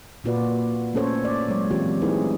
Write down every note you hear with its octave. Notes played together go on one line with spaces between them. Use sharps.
A#2 A#3 F4 F#4 B4 D5
A3 A#3 C#4 A4 C5 C#5
D5
F#3 G#3 A3 C#5
E3 C4 F4 G4
A3 D#4 E4 G#4 B4